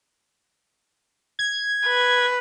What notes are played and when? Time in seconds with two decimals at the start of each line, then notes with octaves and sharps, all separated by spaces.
1.39 G#6
1.85 B4